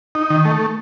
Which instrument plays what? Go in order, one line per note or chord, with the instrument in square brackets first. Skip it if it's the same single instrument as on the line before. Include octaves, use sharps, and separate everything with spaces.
[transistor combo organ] D#4
D#3
A3